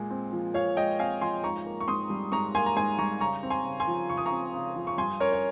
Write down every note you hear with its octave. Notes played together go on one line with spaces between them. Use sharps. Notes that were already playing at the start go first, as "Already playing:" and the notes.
Already playing: A#2 G#3
C4
F3
A#2 C#5 F5
G#3 D#5 G5
C4 F5 G#5
F3 G#5 C6
G#2 A#5 C#6
A#3
C#6
G#2 C6 D#6
G3
G#2 A#5 C#6
A#3 G#5 C6
A#5
G#2 G#5 C6
G3 A#5 C#6
C#3 A#5 C#6
C4
G#5 C6
C#3
G#5 C6
F3
C#3 C#6
D#6
A#5 C#6
C4
C#3
F3
C#6
G2 G#5 C6
C#4 A#4 C#5
C#5